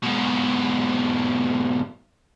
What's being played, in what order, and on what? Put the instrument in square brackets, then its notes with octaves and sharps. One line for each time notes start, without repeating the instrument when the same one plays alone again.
[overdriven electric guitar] G#2 B2